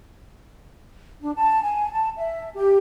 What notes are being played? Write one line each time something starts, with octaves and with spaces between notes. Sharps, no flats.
D4
A5
G#5
A5
E5
G4